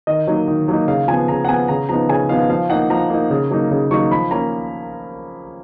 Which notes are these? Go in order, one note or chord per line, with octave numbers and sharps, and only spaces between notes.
D#3 D#5
F#3 A#3 D#4
D#3
F#3 A#3 D#4
C#3 F5
F3 B3 G#5
C#3 A#5
F#5
F3 B3 G#5
C#3 A#5
F3 B3 D#4 A#5
C#3 G#5
F3 B3 D#4 F5
F3 F5
A#3 D#4 F#5
F3 A#5
A#3 D#4
C#3
F#3 A#3 D#4
C#3
F#3 A#3 D#4 C#6
F3 B5
A#3 C#4 A#5